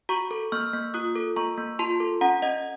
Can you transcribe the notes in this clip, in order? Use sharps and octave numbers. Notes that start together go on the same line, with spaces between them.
F#4 A#5 C#6
A4
A#3 C#6 F6
A#3
F4 D#6 F#6
A4
A#3 A#5 C#6
A#3
F4 A5 C6
A4
C#4 F#5 A#5
C#4 D#5 F#5